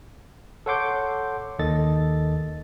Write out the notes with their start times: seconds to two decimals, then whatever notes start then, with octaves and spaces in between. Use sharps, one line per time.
0.66 A4 C#5 F#5 C6 D6 G6
1.59 D#2 D#3 A4 D#5 A6